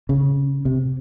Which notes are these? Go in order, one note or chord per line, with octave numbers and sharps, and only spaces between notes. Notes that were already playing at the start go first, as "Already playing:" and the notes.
C#3
C3